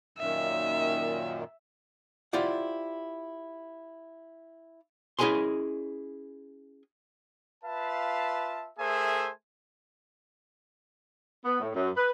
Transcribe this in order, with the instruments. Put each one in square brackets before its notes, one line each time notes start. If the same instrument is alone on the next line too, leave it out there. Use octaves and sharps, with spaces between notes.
[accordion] F#2 A#2 D#3 [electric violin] E5
[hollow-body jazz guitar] E4 F4 G4 C5 D5 F#5
C#4 E4 G#4 D#5 G#5 C6
[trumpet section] F4 B4 E5 F5 A5
A3 G#4 A#4 C5 E5 G#5
[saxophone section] B3
A2
F#2
B4